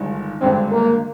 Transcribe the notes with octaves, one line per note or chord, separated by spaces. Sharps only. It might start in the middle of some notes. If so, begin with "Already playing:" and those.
Already playing: G1 G2 D#3 G#3
G#1 G2 D3 G#3 C4
A#3